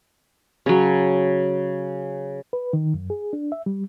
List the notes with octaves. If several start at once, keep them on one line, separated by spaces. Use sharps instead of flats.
C#3 F#3
B4
D#3
F#2
G#4
D4
E5
G3